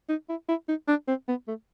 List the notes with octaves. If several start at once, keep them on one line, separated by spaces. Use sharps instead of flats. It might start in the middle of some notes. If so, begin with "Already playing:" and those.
D#4
E4
E4
D#4
D4
C4
B3
A3